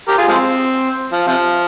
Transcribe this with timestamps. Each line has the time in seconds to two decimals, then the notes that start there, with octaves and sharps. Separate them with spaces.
0.09 G4 A#4
0.18 F4 G#4
0.28 F3 G#3 C4
1.13 F3
1.27 C3 F3